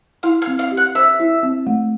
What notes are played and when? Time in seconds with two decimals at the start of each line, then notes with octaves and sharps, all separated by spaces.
0.23 E4 F5
0.42 F5
0.47 C4
0.59 F5
0.71 G4
0.77 F#5
0.95 C5 E5
1.20 E4
1.43 C4
1.67 A3